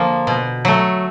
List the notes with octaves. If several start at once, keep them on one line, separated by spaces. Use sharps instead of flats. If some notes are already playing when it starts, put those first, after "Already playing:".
Already playing: D3 F3 A#3
B2
F#3 A3